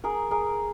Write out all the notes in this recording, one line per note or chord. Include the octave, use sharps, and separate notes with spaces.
G#4 A#4
G#4 A#4